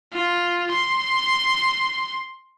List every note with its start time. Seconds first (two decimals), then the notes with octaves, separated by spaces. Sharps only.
0.13 F4
0.72 C6